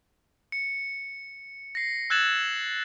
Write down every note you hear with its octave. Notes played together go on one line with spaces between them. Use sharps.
C#7
A#6 C7
E6 F#6 G#6 A6 E7 F#7